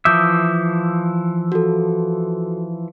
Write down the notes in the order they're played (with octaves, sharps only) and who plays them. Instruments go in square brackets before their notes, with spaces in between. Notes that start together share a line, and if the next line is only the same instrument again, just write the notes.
[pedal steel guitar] E3 F3 E5 [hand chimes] D6 D#6 G6
[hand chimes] F#4 A4